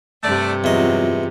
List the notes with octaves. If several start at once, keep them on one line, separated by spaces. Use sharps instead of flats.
G2 C3 A3 D5
E2 F#3 C4 F4 D#5